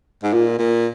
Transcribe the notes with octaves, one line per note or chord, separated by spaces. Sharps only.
G#2
A#2 F4
A#2